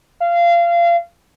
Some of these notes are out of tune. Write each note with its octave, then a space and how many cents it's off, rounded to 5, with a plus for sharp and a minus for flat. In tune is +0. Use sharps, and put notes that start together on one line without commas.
F5 -25